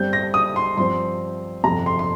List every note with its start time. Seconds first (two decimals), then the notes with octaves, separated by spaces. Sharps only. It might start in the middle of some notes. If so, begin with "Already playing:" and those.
Already playing: G1 G2 G3 C4 G6
0.13 A#6
0.34 D#6
0.56 C6
0.77 G2 F3 C4 C6
1.64 G1 F2 C3 A#5
1.86 C6
1.99 C6